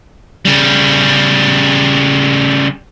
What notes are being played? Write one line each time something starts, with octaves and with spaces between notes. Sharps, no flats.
C#3 G3